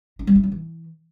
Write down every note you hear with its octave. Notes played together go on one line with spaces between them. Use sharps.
D#4
G3
E4
F#3
E3